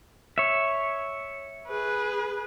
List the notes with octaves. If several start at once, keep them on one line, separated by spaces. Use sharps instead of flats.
C#5 E5
G#4 B4